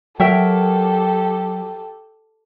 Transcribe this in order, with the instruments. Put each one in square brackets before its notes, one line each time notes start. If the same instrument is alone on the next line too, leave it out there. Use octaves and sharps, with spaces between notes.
[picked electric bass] F#3 [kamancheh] G4 A4 [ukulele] A#4 E5 G5